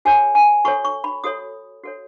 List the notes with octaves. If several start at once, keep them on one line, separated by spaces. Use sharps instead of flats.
F#4 A4 C#5 G#5
G#5
F#4 A4 C#5 C#6
C#6
B5
F#4 A4 C#5 D#6
F#4 A4 C#5